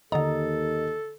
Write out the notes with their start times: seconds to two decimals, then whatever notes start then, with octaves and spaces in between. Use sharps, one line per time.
0.12 D#2 D3 A4 D#5 A#5